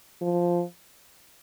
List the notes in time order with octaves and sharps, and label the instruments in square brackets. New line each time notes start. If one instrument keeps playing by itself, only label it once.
[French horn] F3